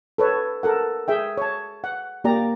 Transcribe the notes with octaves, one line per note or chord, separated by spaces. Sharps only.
A4 B4 C#5
A4 A#4 F#5
G#4 E5 G5
C#5 A5
F#5
A#3 G4 D5 A#5